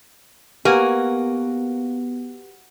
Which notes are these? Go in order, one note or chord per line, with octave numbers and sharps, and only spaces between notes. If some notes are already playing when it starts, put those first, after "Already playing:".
A#3 B3 F#4 G4 A#4 B4 F#5 G#5